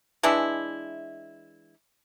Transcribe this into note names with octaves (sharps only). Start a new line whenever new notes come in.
E3 G#3 D4 E4